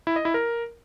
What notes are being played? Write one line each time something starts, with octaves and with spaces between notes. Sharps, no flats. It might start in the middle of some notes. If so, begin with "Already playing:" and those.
E4
D#5
E4
A#4